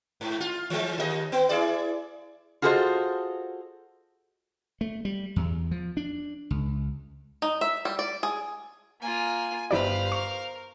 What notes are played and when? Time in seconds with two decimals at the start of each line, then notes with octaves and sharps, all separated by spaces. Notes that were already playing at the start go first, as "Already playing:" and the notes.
0.21 G#2
0.40 F4
0.70 E3 G#3
0.98 D#2 D#5
1.32 B3
1.49 E4 G#4 D5
2.62 F4 F#4 G#4 A4 C5 D#5
4.81 A3
5.05 G3
5.36 E2
5.71 F3
5.97 D4
6.51 C#2
7.42 D#4
7.61 E5
7.85 G3
7.99 D5
8.23 G#4
9.02 A#3 F4 G#5
9.71 G1 E4 G4 B4 C5 D5 F5
10.12 A#4 C#6 F7